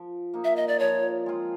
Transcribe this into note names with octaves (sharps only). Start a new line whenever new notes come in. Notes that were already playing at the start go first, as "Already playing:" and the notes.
Already playing: F3
A#3 D#4
E5
D#5
D5
F3 C#5
G#3 C4 F4